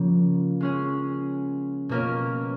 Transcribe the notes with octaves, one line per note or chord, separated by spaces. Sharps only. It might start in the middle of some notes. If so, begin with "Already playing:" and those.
Already playing: C#3 F3 A#3
G#3 C#4 G#4
B2 A#3 C#4 F4 A#4